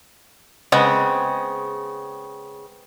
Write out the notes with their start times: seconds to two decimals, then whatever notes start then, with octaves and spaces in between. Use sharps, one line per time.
0.72 C#3 G#3 B3 C4